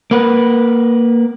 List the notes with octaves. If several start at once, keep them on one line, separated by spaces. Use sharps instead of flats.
A#3 B4